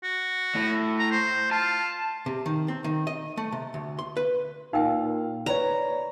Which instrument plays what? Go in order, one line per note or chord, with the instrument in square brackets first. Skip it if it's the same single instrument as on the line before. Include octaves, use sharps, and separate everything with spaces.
[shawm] F#4
[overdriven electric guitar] A2
[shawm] A#5
C5
[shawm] F4 [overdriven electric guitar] A5
[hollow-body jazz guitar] C3
D#3
C4
D#3
D#5
A3
C3
D2
C6
B4
[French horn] A#2 [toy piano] D#4 A#4 G5 [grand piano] F5
[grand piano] B4 C#5 [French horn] D5 [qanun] A#5